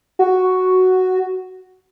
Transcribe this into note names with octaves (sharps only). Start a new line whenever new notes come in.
F#4